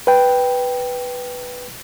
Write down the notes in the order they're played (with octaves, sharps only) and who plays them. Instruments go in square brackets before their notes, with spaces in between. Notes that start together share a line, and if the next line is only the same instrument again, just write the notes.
[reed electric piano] B4 G5